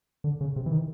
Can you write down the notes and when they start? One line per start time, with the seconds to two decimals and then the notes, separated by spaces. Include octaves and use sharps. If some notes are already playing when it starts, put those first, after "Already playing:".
0.24 D3
0.41 C#3
0.56 C3
0.66 E3
0.71 D#3